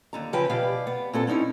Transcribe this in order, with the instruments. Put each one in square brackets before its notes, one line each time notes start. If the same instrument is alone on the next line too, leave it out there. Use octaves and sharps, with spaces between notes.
[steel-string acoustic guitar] D#2 D3 A#5
C#3 F3 B4 G5 G#5
B2 G4 D5 F5
B3
A#2 C4 A4
C4 C#4 D#4 E4